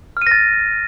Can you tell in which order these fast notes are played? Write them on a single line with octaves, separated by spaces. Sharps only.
F6 D#7 A#6 A6